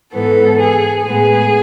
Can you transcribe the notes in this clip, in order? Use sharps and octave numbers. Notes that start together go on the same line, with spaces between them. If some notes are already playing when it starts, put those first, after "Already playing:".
G#2 E3 B3 A4
G#4
A2 G#3 B3 G#4